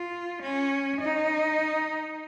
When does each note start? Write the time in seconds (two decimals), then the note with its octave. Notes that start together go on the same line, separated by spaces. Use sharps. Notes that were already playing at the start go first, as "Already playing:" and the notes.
Already playing: F4
0.42 C#4
1.00 D#4